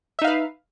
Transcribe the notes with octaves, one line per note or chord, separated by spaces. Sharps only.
D#4 B4 E5 F5